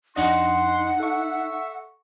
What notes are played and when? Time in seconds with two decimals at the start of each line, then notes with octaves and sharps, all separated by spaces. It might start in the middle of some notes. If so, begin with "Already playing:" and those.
0.16 F2 D4 D#4 D#5 F#5 C6
1.00 A4 E5 C#6